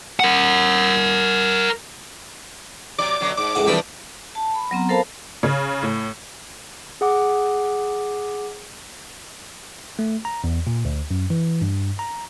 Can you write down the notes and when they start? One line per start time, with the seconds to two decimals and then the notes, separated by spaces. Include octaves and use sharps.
0.20 A#4 F#5
2.98 C3 F#3 D5 D6
3.20 B2 D3 F#3
3.37 G#2 D6
3.55 C#2 A2 F#5
3.66 C2 E3 F3 A3 D4 B5
4.35 A5
4.54 B5
4.71 F#3 B3 C4 A#5
4.89 A4 A#4 C5 F5 A5 B5
5.43 C#3
5.83 A2
7.01 G#4 F#5 D6
9.99 A3
10.25 A#5
10.44 E2
10.67 A#2
10.85 D2
11.11 F#2
11.30 E3
11.61 G2
11.99 A#5